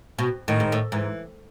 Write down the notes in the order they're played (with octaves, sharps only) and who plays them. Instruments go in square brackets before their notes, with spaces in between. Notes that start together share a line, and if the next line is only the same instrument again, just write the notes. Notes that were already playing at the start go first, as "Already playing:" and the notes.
[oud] B2
[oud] A2 [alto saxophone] D#3
[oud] G#2
A2
[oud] G#2 [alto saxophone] E3